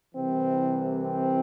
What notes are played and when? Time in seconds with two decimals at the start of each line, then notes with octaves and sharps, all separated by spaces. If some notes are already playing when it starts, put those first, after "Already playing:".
0.15 C2 C3 E3 C4
1.02 C4